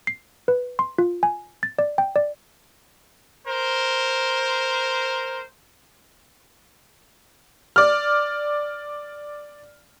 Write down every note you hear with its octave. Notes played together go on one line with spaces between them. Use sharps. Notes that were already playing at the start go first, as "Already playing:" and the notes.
C7
B4
C6
F4
G#5
A6
D5
G5
D5
A#4 C5
D5 F6